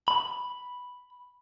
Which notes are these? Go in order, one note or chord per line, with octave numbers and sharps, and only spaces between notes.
B5